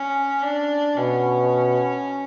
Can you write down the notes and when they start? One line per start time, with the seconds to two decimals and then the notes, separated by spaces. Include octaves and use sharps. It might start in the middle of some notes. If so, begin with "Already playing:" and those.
Already playing: C#4
0.42 D4
0.97 B2 C#4